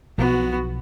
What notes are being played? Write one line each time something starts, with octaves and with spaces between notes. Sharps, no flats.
B1 B2 F3 B3 F#4